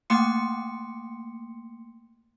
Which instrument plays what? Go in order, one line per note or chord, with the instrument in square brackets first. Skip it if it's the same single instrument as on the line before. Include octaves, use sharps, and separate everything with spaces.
[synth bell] A3 A#3 G5 C6 C#7